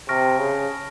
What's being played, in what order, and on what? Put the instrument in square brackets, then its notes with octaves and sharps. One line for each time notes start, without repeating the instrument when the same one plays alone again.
[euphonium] C3 [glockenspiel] A5 C#6 F6 A#6 D7
[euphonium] C#3